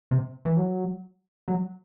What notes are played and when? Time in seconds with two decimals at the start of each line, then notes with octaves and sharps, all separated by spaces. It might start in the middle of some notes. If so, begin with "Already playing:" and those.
0.11 C3
0.45 E3
0.57 F#3
1.48 F#3